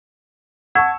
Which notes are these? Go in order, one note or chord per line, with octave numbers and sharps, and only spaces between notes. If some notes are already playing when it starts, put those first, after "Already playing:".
F#5 A5 C#6 E6 G#6